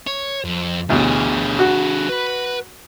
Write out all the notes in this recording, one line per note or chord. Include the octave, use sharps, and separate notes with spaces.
C#5
F2
A1 D2 B2 D3 G#4
F#4
B4 B5